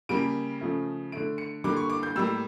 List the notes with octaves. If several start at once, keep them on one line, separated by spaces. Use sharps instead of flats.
C#3 G3 A#3 D7
C#3 F3 A3
D3 A3 D7
C#7
D3 G3 A#3 D6
C#6
D6
G6
A2 G3 A#3 E6